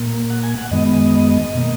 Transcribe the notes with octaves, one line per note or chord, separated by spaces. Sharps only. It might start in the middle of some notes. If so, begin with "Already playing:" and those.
Already playing: A#2 A#3
F#5
G#5
F#5
F#2 D#3 G#3 B3 D#5
B2 A#3